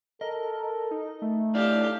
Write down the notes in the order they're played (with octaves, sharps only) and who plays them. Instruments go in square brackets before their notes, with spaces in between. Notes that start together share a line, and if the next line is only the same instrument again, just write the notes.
[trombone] A4 [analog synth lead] A#4 [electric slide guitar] D#5
[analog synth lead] D#4
[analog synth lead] A3 [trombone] D#4
[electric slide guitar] D4 E4 D5 [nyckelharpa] G4 F5